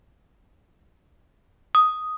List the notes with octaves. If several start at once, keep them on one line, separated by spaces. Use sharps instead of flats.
D#6